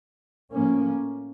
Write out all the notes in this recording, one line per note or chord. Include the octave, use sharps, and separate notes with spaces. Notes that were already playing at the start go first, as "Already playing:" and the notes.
A2 F3 A#3 C#4